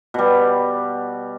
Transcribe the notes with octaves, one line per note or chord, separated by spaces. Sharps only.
B2 G3